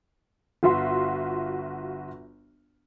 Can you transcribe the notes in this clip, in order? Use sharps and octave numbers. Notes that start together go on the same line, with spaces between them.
G1 F4 F#4 E5 C6